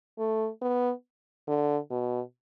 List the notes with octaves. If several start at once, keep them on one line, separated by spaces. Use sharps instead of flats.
A3
B3
D3
B2